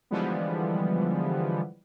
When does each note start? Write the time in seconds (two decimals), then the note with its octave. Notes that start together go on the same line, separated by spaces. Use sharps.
0.11 D3 E3 F3 G3 G#3 B3